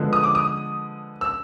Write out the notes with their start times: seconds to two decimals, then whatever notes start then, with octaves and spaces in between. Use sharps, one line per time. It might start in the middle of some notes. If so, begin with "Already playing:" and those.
Already playing: D3 F3 G#3 B3
0.13 D#6
0.24 D6
0.35 D#6
1.21 E6